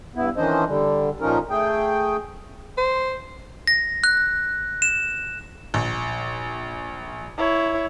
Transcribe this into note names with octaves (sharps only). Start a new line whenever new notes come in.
G2 B3 E4
D#3 E3 C#4 D4 C5 D#5
D3 G3
A#2 F3 C#4 D#4 A#4
A3 G#4 G5
C5
A#6
F#6
E7
A#1
E4 C#5